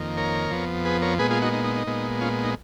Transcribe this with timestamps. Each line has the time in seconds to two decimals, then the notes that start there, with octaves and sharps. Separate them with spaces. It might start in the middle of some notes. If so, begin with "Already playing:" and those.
Already playing: F2 D#3 A#3
0.17 A#4 C#5
0.51 F2 F3 B3
0.85 G#4 B4
1.02 A#4 C#5
1.19 A#2 G#3 B3 G#4 B4
1.31 F4 G#4
1.42 D#4 F#4
1.53 D#4
1.64 D#4
1.76 D#4
1.87 A#2 G#3 B3
2.21 C#4 F4
2.44 D#4